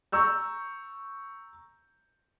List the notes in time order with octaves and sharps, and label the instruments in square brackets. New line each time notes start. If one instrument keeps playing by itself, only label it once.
[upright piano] A#5 C#6 E6 G6